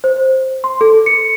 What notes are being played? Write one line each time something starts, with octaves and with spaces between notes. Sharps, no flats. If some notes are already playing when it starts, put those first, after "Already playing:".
C5
C6
A4
C#7